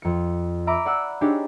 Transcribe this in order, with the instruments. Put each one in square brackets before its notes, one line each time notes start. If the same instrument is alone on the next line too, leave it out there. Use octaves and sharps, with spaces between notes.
[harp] F2 C#7
E5 A#5 B5 D6
D5 F#5 E6
D4 D#4 G4 G#4 C#5